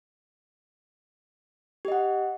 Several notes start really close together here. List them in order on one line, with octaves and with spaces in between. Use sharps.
G4 D#5 F#5